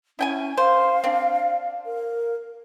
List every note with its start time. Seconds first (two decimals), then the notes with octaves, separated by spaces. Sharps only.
0.19 C#4 E4 G5 G#5
0.57 C5 F5
1.04 C4 D4
1.85 A#4